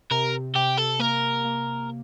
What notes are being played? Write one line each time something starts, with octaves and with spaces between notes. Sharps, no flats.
C3 A#4
C3 G4
A4
A#3 A#4
A#3